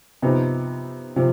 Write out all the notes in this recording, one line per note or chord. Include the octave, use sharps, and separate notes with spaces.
C3 F3 B3 D#4
C3 F3